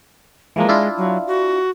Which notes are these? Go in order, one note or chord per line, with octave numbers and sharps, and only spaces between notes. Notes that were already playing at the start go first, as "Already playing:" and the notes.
E3 F3 G#3 A#3
D4 E4 F4
F#3
F#4